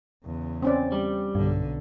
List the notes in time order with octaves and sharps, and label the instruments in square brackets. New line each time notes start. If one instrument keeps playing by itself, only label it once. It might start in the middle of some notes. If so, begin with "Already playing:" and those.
[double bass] E2 C#3
[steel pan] C4 C#4 D5
[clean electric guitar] G3
[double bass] B1 D3 [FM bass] G2